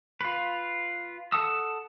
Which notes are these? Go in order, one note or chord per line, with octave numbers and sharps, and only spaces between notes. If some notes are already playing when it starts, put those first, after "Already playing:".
F4 B4
A4 F#5 A5 D#6 E6